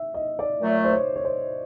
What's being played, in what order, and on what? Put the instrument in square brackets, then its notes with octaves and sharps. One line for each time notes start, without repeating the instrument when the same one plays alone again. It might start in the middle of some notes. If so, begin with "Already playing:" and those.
Already playing: [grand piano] E5
D#5
D5
[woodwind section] A#2 F#3 A3
[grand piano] C5
C#5
C#5
C5